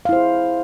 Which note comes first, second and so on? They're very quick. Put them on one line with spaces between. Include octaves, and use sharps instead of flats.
F5 E4 C5 G#4